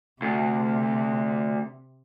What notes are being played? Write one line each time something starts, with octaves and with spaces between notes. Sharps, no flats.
D2 C3